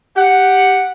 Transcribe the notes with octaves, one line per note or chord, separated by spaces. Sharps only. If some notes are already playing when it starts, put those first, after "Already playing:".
G4 F#5